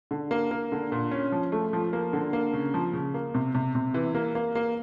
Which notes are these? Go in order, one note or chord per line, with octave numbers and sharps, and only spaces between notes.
D3
A#3
A#3
D3
A#2
C#4
F3
A3
F3
A#3
D3
A#3
C#3
F3
C#3
A#3
C3
C3
C3
E3
A#3
A#3
A#3